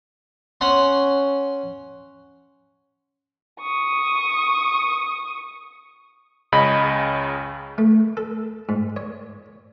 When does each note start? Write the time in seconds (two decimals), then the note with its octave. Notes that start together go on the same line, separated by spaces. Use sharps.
0.61 C#4 F#5 C6
3.60 C#6 D#6
6.52 C#2 C#3 D#5 B5
7.78 A3
8.17 A4
8.69 G#2
8.96 C#5